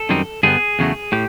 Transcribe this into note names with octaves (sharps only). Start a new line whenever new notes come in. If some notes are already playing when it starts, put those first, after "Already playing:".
Already playing: A4
F#2 D#3 G3 C4 D#4
G2 D3 G3 B3 G#4
E2 C#3 F#3 A3
A2 G4